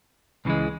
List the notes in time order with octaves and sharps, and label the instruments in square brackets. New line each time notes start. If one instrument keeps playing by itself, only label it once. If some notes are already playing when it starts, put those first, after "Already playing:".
[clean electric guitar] C#2 C#3 E3 G#3